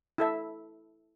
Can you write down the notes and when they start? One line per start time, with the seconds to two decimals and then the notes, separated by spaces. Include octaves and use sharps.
0.18 E4 A4 E5